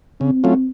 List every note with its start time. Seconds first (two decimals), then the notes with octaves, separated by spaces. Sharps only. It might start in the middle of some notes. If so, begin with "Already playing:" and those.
0.21 C#3 C4
0.44 F#3 A3 C#4 F4